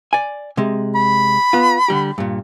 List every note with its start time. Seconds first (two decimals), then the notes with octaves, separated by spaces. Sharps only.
0.13 D5 G#5
0.57 C3 G#3
0.95 B5
1.53 B3 F4
1.88 D3 G3 G4
2.18 G2 A#2